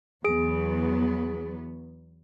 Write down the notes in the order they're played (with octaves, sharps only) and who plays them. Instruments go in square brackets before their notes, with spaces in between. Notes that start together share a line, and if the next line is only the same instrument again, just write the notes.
[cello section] E2 F#3 B3 [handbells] G#4 D7